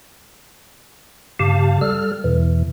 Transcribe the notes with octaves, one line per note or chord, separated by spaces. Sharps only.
G2 C#3 G4 F5 A5
G3 A4 F6
E2 B2 E3